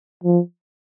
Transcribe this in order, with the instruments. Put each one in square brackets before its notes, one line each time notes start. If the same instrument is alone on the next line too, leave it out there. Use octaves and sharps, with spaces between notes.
[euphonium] F3